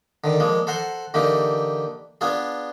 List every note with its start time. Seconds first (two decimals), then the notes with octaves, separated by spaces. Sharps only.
0.24 D3 D#3
0.40 F3 G#3 A#3
0.67 A4 C5 F#5 A#5 C6
1.14 D3 E3 A#3 D#4 G4
2.21 B3 D4 F4 G#4